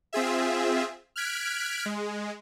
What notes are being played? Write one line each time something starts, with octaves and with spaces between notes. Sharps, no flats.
C4 F4 G#4 E5
F6 F#6 G#6 B6 D7
G#3